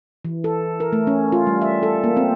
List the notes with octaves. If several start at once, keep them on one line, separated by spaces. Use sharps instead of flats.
E3
A4
A#4
A3
C#4
F4
G3
E5
A4
A#3
C4